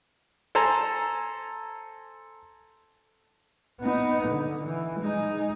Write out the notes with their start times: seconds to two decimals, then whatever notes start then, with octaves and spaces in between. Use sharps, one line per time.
0.55 A4 C5 G#5 A#5
3.81 B3 D#4
4.28 D3
4.64 E3
5.00 G#3 D#4